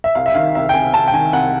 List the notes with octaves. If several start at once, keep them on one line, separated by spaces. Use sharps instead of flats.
E5
C2 F5
E5
D#3 F5
C2 E5
G5
C3 G#5
C2 A5
G5
D#3 G#5
C2 F#5